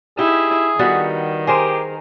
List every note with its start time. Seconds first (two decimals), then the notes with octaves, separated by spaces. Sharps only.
0.19 D#4 E4 G4 G#4
0.79 D#3 G3 B3 F#4
1.47 G4 G#4 A#4 C5